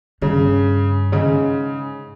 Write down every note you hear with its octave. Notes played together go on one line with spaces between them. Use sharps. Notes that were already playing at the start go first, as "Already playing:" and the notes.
G2 C#3
G#2 C#3